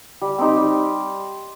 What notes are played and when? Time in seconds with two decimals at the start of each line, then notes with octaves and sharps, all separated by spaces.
0.21 G3
0.38 C4 D#4 G4
0.57 G3